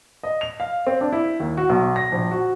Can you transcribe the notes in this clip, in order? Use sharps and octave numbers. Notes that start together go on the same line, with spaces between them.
D#5
F7
F5
C4
D4
E4
D#2
F#4
B1
A#6
A#1
F#4